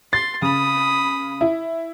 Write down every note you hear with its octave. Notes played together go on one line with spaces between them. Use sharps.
C6 A6
C#3 B5 D#6
E4